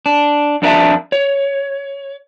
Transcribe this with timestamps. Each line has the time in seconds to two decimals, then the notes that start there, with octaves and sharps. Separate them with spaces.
0.06 D4
0.62 F2 D4 A#4 E5 A5
1.12 C#5